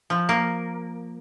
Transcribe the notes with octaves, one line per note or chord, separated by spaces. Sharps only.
F3
A#3